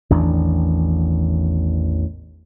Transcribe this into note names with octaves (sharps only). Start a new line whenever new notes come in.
A1 E2 D#3 D4